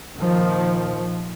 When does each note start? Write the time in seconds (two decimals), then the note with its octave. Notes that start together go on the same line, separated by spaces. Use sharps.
0.16 A#2 D#3 F3